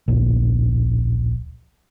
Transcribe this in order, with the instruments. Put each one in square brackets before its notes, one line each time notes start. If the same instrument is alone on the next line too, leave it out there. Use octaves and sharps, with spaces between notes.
[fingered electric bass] D1 A#1